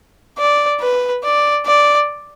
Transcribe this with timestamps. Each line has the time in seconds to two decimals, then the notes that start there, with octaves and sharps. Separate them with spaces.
0.38 D5
0.81 B4
1.24 D5
1.66 D5